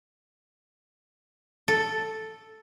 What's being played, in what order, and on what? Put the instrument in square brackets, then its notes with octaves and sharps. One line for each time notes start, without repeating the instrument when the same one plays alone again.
[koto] A4